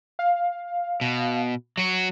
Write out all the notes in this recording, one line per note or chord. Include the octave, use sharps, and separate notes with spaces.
F5
B2
F#3 F#4